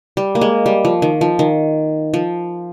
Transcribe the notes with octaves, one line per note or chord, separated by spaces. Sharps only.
G3
A#3
G#3
G3
F3
D#3
F3
D#3
F3